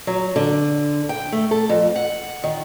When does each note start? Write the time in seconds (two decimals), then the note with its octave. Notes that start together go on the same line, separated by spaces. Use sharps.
0.07 F#3
0.36 D3
1.09 G5
1.32 A3
1.51 A4
1.69 F2
1.96 F#5
2.44 D#3